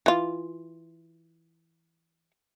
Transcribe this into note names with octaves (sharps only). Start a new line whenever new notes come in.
E3 F4